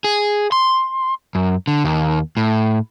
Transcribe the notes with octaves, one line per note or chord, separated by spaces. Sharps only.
G#4
C6
F#2
D3
D#2
A2